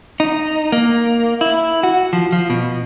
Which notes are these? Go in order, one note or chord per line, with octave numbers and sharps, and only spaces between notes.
D#4
A#3
E4
F#4
F3
F3
B2